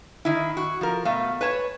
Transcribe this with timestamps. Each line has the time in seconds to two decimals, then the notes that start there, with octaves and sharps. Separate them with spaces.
0.25 D#3 E4
0.57 F#4
0.81 F3 A#4
1.05 B2 A3 F5
1.41 B4 C#5 A5